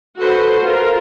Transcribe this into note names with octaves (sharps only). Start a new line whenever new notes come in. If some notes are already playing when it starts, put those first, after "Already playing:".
F#4 A4 B4 C5 F#5
F4 A#4